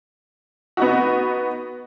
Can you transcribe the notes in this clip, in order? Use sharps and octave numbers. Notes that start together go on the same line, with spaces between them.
B3 D#4 F#4